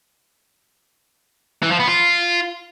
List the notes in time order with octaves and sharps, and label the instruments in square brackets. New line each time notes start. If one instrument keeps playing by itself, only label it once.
[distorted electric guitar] E3
F3
B3
F4